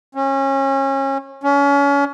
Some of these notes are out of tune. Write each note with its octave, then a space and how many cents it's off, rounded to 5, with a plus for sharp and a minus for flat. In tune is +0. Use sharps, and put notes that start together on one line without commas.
C#4 -30
C#4 +30